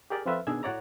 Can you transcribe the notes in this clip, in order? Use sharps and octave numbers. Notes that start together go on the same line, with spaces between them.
G4 G#4 A#4 D5
F3 C4 F4 A4 B4 E5
B2 D#3 D4 G#4 E6 G#6
A2 F#4 C#5 D5 A#5